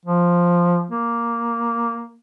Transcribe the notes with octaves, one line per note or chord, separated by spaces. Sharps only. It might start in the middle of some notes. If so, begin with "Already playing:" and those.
F3
A#3